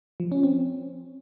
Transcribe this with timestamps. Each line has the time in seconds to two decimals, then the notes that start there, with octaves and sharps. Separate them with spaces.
0.20 F3
0.32 C#4
0.43 C4